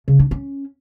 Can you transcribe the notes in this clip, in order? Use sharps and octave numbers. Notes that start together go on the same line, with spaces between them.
C#3
D4
C#4